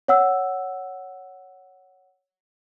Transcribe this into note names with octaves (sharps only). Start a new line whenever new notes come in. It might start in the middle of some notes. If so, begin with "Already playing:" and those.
C#5 F#5 E6